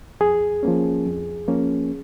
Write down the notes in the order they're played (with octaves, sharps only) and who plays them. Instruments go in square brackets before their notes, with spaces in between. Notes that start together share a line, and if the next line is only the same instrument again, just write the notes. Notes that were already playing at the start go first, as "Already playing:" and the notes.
[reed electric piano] F2 G#4
F3 A#3 C#4
F2
F3 A#3 C#4